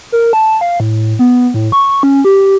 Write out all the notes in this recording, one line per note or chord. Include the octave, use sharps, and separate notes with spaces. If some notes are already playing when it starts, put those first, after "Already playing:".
A#4
A5
F5
A2
B3
A2
C#6
C#4
G4